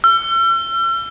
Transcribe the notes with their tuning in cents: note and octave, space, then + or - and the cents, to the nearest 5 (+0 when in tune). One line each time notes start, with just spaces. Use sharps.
E6 +45